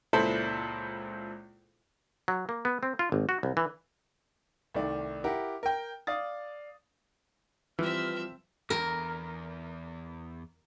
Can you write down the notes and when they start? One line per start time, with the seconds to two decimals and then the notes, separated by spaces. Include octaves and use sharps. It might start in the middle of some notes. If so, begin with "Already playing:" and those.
0.13 C#2 A#2 E4 A4 C5 A5
2.28 F#3
2.49 A#3
2.65 B3
2.83 C4
2.99 F4
3.12 G#1
3.29 F#4
3.43 C2
3.57 E3
4.74 C2 D#3 A3 D5
5.24 E4 G4 A#4 F#5
5.63 A#4 G5
6.07 D5 F5 D#6 A6
7.79 E3 F3 G3 C4 G4 B4 E5 F6
8.70 E2 A#4